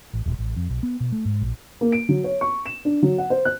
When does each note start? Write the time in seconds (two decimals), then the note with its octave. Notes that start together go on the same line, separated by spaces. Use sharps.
0.14 A1
0.26 D#1
0.39 A1
0.56 F2
0.69 B1
0.83 B3
1.00 B2
1.12 A3
1.25 G#2
1.42 A#1
1.81 A#3
1.92 D7
2.09 F#3
2.24 C#5
2.41 C#6
2.66 E7
2.85 D4
3.03 F#3
3.18 F#5
3.30 C5
3.45 F#6